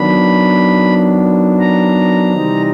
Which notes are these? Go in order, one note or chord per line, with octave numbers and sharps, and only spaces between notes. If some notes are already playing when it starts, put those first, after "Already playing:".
Already playing: D#3 F#3 B3 D4 B5
A#5
C3 E3 G3 C4 D#4